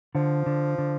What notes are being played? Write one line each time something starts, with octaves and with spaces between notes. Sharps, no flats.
D3 F3
D3
D3